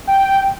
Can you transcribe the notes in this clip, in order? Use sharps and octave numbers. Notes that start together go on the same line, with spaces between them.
G5